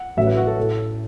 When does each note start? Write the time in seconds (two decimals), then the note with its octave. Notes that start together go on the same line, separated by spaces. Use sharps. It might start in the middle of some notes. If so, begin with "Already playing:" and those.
Already playing: F#5
0.17 A1 A2 F#3 C#4 F#4 E5
0.27 B4
0.37 F#4
0.47 A4
0.59 A2 A3